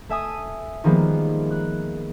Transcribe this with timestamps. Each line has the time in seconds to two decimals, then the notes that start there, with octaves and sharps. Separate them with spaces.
0.09 A3 E5 G#5 D#6
0.84 D#3 F3 G3 G#3 A#3 B3
1.50 F#6